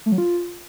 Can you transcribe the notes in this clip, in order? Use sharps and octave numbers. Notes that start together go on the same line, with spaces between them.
A3
F#3
F4